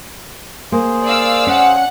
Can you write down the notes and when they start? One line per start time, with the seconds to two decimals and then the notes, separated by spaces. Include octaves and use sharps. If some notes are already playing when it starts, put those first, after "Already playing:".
0.72 A#3 G#4 C5
1.04 D5 F5 E6
1.47 C#4 F#5